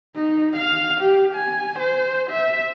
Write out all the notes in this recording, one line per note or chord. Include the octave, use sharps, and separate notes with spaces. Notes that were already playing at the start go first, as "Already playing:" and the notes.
D#4
F5
G4
G#5
C5
E5